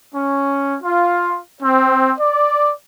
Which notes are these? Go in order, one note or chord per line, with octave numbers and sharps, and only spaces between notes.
C#4
F4
C4
D5